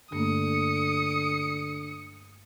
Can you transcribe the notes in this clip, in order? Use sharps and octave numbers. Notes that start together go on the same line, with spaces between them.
G2 D3 A3 A#3 D#6 C#7